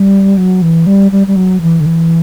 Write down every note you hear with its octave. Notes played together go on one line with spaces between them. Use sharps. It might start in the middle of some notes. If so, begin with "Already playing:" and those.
Already playing: G3
F#3
E3
G3
G3
G3
F#3
E3
D3
E3